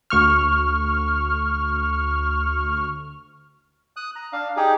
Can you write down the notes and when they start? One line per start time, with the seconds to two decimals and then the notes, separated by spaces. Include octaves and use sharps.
0.10 D2 C#6 F6
3.97 D#6 F#6
4.16 A#5
4.33 D4 F5
4.57 D#4 G4 G#4